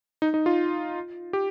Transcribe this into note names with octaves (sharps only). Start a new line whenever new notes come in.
D#4
D#4
F4
G4